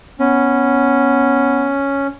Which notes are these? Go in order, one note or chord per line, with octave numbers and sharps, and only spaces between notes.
B3 C#4